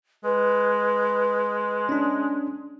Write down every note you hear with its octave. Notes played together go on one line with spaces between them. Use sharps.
G#3 B4
C#4 D4